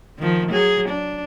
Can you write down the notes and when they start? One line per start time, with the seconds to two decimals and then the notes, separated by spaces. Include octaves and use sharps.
0.19 D#3 F3
0.51 F#3 G#4
0.89 D4